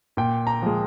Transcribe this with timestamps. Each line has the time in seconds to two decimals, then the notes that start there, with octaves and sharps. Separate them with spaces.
0.17 A#2 G5
0.47 A#5
0.62 F3 G#3